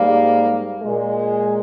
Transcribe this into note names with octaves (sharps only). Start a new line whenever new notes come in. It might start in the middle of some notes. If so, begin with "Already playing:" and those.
Already playing: G#2 G3 A#3
A#2 G#3